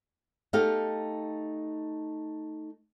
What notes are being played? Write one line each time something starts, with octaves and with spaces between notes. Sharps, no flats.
A3 D#4 G4 F5